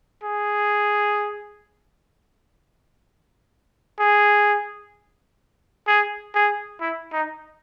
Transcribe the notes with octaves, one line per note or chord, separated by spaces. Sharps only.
G#4
G#4
G#4
G#4
E4
D#4